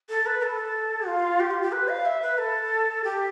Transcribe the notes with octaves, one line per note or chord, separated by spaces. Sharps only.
A4
B4
A4
F4
G4
F4
G4
B4
F5
E5
B4
A4
G4